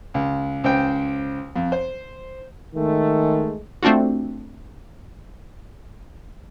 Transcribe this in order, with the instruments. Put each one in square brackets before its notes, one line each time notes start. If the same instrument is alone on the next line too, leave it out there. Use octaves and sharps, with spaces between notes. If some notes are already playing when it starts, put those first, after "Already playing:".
[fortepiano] C#2
C#2 C5 G5
F2
C5
[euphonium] D#3 [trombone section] G#3 A3
[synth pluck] A3 C4 D4 F4 F#4